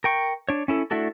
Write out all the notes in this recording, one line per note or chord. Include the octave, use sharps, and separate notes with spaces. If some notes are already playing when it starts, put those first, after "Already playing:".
A#4 G5 C#6
D4 C#5
C#4 E4 A4
A3 D4 E4 F#4 A4